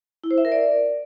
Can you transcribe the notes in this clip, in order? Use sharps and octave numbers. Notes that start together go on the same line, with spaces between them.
E4
C5
E5
A#4
D5